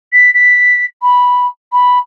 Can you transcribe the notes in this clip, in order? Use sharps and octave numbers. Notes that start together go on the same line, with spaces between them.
B6
B6
B5
B5